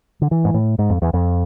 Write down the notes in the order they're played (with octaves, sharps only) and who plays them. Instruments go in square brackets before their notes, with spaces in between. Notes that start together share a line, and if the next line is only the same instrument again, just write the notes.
[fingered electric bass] D3
E3
G#2
A2
G#2
F2
E2
F2